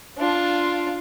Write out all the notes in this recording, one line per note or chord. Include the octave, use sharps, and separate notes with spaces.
D4 F4